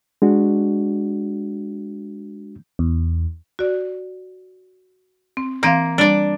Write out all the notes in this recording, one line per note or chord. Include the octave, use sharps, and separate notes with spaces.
G#3 D4 F#4
E2
F#4 D5
C4
E3 A#3 C4 F5
G3 D4 D5